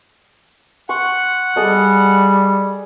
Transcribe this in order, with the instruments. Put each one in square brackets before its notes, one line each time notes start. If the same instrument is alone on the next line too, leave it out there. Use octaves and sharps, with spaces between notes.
[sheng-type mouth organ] F#5 [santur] C6 C#6
[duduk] G3 [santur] G#4 A4 D#5